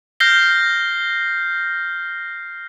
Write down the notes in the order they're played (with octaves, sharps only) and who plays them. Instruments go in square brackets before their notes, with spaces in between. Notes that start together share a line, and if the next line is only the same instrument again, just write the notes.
[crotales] F6 G6 A#6 C7 G7